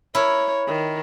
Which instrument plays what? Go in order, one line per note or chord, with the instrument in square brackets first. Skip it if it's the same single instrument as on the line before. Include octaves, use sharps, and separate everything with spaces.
[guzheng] E4 A#4 [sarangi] C#5
[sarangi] D#3